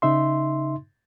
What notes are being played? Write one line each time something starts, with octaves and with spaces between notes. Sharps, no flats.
C#3 D#4 E5 C6